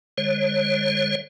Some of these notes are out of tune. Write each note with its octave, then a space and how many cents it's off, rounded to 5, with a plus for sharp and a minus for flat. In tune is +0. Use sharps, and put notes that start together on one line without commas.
D3 +0 G#3 -40 C#5 -35